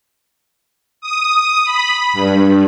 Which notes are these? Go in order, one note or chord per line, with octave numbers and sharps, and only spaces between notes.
D#6
B5
G2